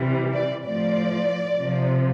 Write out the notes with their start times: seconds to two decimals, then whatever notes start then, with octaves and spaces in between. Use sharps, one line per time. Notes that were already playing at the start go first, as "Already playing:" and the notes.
Already playing: C3 E3 G3
0.33 D5
0.64 A2 F3 D5
1.58 C3 F3